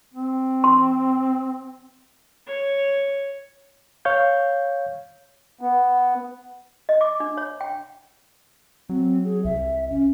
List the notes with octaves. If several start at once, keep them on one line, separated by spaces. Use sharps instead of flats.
C4
C6
C#5
C#5 F5 G6
B3
D#5
D6
D4
C#5
G5
F#3 C4
G#4
C2 E5
C#4